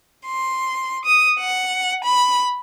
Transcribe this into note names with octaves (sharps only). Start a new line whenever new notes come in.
C6
D#6
F#5
B5